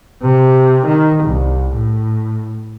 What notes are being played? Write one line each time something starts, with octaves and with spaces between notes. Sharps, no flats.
C3
D#3
C2
A2